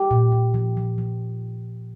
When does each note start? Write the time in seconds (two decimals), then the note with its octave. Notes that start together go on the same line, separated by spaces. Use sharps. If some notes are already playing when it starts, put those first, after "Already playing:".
Already playing: G4
0.11 A#2
0.32 A#2
0.54 F3
0.77 F3
0.98 F3